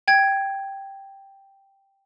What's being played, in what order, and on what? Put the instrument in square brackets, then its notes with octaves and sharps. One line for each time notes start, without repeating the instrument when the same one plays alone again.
[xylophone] G5 G#6